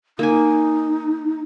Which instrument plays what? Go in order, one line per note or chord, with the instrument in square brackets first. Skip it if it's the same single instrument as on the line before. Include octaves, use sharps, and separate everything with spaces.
[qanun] A#3 G#5 [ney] D#4